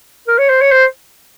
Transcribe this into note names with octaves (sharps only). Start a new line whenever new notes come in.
A#4
C#5
C5
C#5
C5